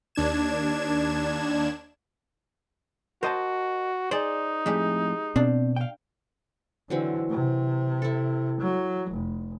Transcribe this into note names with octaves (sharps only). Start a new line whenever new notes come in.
D#2 D4 G#6 E7
F#4 A#4 C5 D#5 A5
D#4 G#4 C5 D5
F2 A2 G#3 G4
B2 C4 D4
F5 G5
D3 E3 F#3 C4
C3
E4 A4
F#3
F1